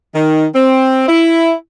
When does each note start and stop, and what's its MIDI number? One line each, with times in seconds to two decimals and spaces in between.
0.15 0.47 51
0.55 1.07 60
1.09 1.53 64